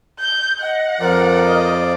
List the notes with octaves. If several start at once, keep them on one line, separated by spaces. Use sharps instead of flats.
G6
D#5 F#5
F2 F3 A#4 D5
D#5